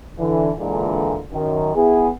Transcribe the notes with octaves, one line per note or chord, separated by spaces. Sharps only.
D3 E3
A#2 D3 E3 G#3
F#2 D#3
B3 E4 G#4